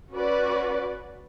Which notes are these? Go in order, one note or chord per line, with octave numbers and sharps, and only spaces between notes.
C#4 F#4 B4 D5